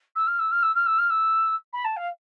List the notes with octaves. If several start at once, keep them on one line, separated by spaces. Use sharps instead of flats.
E6
F6
E6
F6
E6
F6
E6
F6
E6
B5
A5
F5